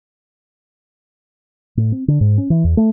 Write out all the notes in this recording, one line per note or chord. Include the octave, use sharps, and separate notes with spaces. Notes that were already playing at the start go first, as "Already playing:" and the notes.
A2
C4
D3
G#2
C#4
E3
E2
A3